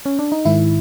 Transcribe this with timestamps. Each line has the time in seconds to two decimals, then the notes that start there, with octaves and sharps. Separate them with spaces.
0.06 C#4
0.19 D4
0.32 D#4
0.45 G#2 D#3 E4